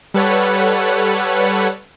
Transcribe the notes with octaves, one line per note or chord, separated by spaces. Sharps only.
G3 A4 B4 C#5 F#5